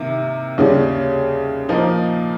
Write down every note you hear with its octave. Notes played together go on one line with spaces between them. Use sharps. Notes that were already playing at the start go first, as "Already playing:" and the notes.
Already playing: C3 D#3 A#3
D#2 C#3 G3
A#2 F3 A#3 D#4